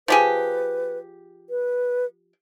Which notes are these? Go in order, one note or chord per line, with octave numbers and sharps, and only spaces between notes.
F3 G4 G#4 B4
B4